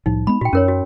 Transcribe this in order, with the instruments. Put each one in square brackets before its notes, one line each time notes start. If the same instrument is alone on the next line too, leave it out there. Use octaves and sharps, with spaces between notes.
[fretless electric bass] C2 A2 F3 [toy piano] D#4
[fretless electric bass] G#3 B3 [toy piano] B5
[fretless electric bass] A#2 [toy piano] F#4 G5
[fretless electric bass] F#2 [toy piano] C#4 A#4 C#5
[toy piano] F#4